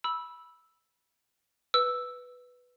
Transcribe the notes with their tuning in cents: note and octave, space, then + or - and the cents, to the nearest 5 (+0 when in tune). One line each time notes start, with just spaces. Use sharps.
B5 -15 E6 -5
B4 +0 E6 +0